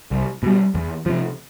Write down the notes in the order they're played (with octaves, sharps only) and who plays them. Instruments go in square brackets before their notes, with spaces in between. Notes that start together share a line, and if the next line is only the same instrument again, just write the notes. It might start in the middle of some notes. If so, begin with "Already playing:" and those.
[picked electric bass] C2
B2 G3
E2
C3 F3